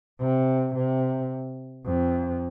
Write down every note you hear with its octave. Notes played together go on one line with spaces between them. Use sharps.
C3
C3
F2